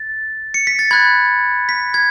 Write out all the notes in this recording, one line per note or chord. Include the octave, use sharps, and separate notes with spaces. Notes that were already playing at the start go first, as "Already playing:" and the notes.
Already playing: A6
C#7
B6
A6
B5 F#6 G#6
B6
G#6